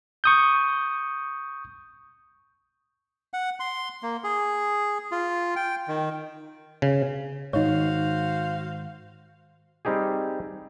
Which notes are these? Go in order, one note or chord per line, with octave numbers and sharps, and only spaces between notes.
C#6 D#6 G6
F#5
C6
A#3
G#4
F4
G5
D#3
C#3
G#2 D#3 D#4 F#4 C5 C#5 F5
G3 C4 D#4 G4 G#4